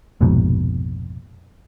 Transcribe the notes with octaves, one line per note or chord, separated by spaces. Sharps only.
F1 A#1 G#2 B2